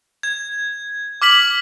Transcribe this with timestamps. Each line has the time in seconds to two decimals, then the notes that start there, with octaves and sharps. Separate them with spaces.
0.23 G#6
1.22 D6 F6 B6 F#7